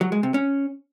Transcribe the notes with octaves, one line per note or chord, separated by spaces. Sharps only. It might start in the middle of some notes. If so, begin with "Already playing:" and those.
F#3
G#3
C3
C#4